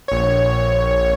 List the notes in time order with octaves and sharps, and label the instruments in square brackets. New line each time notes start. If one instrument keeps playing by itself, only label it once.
[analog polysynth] A#1 C#5